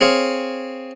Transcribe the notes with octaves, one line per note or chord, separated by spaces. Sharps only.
C4 G#4 C#5 F5